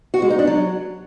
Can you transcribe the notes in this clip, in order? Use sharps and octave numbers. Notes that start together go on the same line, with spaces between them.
F#4
G#3
D#4
D4
F#3